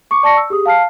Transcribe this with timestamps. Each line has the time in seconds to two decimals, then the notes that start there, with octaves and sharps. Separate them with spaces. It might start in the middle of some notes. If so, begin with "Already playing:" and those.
0.11 C#6 D6 C#7
0.23 D5 A5 C#6 A#6 C#7
0.37 E6
0.50 G4 G#4 D#6
0.66 F5 A5 F6 C7